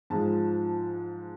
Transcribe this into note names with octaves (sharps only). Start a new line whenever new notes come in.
G#2 F3 G#3 A5